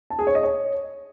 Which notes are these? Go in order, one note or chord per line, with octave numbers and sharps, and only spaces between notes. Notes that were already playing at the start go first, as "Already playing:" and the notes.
A5
G#4
C#5
D#5
C#5